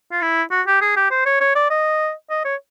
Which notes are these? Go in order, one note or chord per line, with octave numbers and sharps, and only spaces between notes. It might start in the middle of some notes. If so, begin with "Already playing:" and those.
F4
E4
F#4
G4
G#4
G4
C5
C#5
C#5
D5
D#5
D#5
C#5